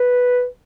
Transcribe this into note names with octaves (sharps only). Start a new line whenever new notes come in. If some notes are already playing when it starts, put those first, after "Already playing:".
Already playing: B4